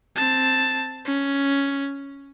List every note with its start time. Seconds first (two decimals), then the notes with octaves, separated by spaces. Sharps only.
0.16 C4 A5
1.05 C#4